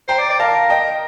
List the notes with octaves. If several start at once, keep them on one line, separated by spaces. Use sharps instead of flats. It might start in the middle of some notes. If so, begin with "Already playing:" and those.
C5 G5 A#5
D5
D5
A#4 F5 A5
D#5 G5